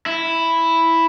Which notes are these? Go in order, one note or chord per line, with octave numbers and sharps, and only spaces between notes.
E4